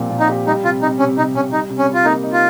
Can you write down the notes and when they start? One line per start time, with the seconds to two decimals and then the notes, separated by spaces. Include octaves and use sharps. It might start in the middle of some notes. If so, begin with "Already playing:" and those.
Already playing: A#2 F3 C4 G4
0.10 A#2
0.20 D#4
0.29 G4
0.46 G3 D#4
0.63 C3 F4
0.82 C3 D#4
0.99 C3 C#4
1.17 C3 D#4
1.35 C3 C#4
1.52 G3 D#4
1.70 C3
1.78 C#4
1.89 G3
1.94 F4
2.05 A#3 D#4
2.23 D#4
2.33 F4